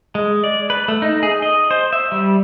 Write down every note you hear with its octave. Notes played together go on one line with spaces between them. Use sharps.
G#3
D5
B4
A3
D#4
G#4
D#5
C5
E5
G3